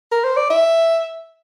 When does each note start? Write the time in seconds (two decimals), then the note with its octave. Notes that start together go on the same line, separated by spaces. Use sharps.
0.12 A#4
0.24 C5
0.37 D5
0.50 E5